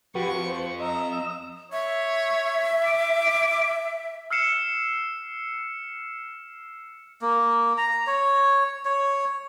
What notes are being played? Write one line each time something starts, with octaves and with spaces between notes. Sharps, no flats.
F2 F#4 G4 B4 C#6
C5
D#5 A#5 E6
C#5 E5
D6
E6 F6 C7 C#7 E7
A#3
A#5
C#5
C#5